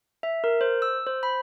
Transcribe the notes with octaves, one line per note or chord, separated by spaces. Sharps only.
E5
A#4
C5
E6
C5
B5